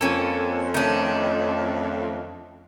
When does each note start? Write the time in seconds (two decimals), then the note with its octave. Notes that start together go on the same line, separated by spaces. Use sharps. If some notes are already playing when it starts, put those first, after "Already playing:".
0.01 F2 A#3 C#4 A4
0.74 D#3 A3 C#4 D4